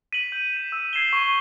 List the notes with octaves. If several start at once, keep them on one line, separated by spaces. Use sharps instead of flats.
B6 D#7 F#7
G6
B6 E7
E6
G#6 C7 E7 G7
C#6